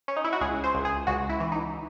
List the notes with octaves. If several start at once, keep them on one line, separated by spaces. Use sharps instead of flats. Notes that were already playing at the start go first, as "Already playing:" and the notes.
C#4
D#4
E4
F#4
C#2 G#4
C5
C#2
G#4
C#2 F#4
E4
E3
D#4